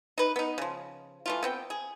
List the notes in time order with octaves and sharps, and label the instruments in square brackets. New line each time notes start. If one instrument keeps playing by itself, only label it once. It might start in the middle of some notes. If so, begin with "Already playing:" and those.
[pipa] D#4 B4
B3 D#4
C#3 F3
E3 A3 F4
B3 C4 G5
G#4